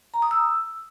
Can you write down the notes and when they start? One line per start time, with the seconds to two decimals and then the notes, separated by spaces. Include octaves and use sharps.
0.14 A#5
0.22 D#6
0.31 E6